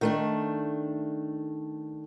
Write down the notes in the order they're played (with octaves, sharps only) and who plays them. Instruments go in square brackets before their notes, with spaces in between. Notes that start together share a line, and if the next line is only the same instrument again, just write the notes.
[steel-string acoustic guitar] D#3 A3 D4